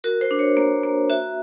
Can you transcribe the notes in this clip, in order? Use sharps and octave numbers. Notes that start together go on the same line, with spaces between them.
F#4 A#4
C5
D4
C#5
A#3
A#3
F#4 E5